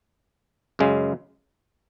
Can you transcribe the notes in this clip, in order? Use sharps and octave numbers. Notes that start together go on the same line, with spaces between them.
F#2 C#3 G#3